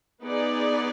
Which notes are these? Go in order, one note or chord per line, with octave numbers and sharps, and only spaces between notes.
B3 D#4 G#4 B4 D5